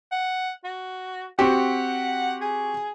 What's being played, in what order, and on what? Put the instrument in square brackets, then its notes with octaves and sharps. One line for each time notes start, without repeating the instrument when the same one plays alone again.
[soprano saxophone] F#5
F#4
[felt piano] C4 F#4 G4 [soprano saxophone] F#5
[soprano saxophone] G#4